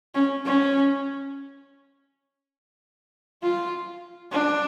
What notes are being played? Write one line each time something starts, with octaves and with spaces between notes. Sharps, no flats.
C#4
C#4
F4
D4